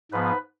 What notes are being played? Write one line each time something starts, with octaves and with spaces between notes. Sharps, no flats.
G#2 F3 B3 B4